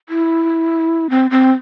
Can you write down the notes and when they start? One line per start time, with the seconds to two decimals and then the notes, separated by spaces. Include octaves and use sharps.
0.09 E4
1.10 C4
1.31 C4